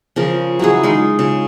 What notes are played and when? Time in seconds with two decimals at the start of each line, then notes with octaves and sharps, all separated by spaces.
0.16 C#3 F3 A#4
0.59 F#3 E4 F#4 G#4
0.83 G#3 D#4 F4
1.19 C#3